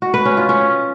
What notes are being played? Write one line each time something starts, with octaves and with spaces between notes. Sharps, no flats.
F#4
B4
C#4
F4
C#4